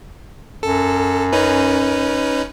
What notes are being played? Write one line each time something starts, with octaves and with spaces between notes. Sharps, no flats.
F#2 A4
C#4 D#4 B4